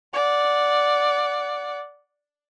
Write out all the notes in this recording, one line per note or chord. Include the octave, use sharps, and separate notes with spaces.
D5 F#5